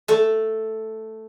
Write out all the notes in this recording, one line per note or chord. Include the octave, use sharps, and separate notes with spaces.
A3 A4